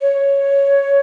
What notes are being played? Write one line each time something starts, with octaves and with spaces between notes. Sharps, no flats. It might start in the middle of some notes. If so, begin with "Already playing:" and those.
C#5